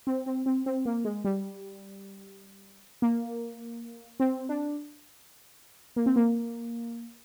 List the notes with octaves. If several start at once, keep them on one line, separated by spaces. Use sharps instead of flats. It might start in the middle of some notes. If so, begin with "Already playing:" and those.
C4
C4
C4
C4
A#3
G#3
G3
A#3
C4
D4
A#3
C4
A#3